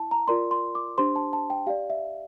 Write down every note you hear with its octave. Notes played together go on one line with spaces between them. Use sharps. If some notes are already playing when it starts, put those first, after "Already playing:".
Already playing: E4 A5
A#5
F4 A#4 D5 C6
C6
D6
D4 G4 C5 C6
A5
A5
G5
G4 D5 F5
E5